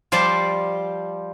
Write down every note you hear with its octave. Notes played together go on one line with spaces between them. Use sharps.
F3 G3 C5 D5 A5